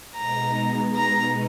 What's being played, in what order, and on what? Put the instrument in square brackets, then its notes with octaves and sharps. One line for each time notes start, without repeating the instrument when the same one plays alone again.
[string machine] B2 G#3 B3 D#4 [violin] A#5
[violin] A#5